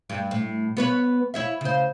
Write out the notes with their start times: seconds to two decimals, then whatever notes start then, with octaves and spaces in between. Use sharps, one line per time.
0.10 G2
0.31 A2
0.77 B3 B4 C#5
1.34 E4 C#5 E5
1.61 C#3 C5